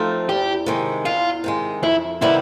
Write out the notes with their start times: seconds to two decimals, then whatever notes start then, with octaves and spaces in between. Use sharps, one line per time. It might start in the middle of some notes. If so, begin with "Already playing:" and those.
Already playing: F3 A3 C4 D#4
0.29 E2 G4
0.66 C3 D#3 G#3
1.05 E2 F4
1.44 C3 D#3 G#3
1.83 F2 E4
2.21 C3 D#3 G3 B3 E4